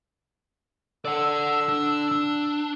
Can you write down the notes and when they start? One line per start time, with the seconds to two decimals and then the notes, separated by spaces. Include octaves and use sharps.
1.05 D3 D5 F#5 E6
1.69 D4
2.12 D4